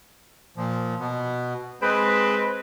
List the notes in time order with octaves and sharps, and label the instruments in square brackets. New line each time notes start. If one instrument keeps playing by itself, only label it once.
[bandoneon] A#2 F3
B2 B3
[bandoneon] G#3 G#4 [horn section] C4 B4